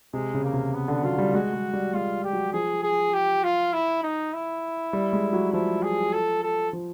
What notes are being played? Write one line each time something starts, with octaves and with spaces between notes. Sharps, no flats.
C3 G#3
C#3
A#3
C3
B3
D3
F#3 F4
G3
G#3 F#4
G#3
G3
G#3 F4
G4
F#3
F3 G#4
G#4
G4
F4
E4
D#4
E4
G3
G#3
F#3
F3 E4
G#4
A4
A4
F3